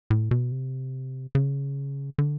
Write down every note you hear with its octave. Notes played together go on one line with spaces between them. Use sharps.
A2
B2
C3
C#3
D3